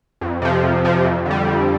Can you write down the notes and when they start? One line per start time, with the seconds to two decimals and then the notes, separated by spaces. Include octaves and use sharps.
0.21 F2
0.42 C3 F3
0.64 F2
0.85 C3 F3
1.05 F2
1.26 D3 G3
1.47 F2